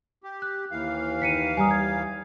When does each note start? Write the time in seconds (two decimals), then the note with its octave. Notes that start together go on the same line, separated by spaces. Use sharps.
0.23 G4
0.42 F#6
0.71 D#2 E3 F5
1.22 D#3 B6 C#7 D#7
1.57 G3 G#5 A#5 D#6
1.71 G#6